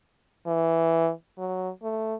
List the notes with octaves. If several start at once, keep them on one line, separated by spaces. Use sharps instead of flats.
E3
F#3
A3